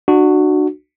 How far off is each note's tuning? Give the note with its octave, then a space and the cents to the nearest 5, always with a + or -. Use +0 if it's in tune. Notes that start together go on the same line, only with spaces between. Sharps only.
D4 +30 F#4 +0